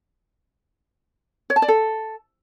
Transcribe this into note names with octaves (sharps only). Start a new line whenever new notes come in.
C#5
A5
D5
A4